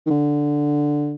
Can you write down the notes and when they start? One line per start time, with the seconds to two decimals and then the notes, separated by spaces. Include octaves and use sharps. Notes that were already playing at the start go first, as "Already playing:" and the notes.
0.06 D#3
0.10 D3